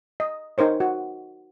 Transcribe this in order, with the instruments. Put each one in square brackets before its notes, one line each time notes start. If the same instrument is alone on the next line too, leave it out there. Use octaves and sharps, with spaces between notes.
[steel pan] D#5
D#4 A#4 C5 C#5
F#4